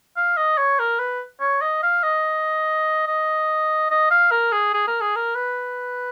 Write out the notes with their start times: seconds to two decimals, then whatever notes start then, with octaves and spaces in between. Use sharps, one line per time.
0.17 F5
0.37 D#5
0.58 C#5
0.79 A#4
0.99 B4
1.41 C#5
1.62 D#5
1.83 F5
2.03 D#5
3.07 D#5
3.90 D#5
4.11 F5
4.31 A#4
4.52 G#4
4.74 G#4
4.87 A#4
5.01 G#4
5.16 A#4
5.35 B4